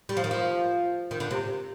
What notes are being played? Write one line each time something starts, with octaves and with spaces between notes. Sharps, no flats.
G3
F3
D#3
F3
D#3
D3
C3